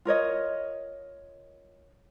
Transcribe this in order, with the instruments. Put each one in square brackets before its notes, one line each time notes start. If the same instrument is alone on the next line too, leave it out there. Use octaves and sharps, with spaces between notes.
[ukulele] F4 A#4 C#5 D#5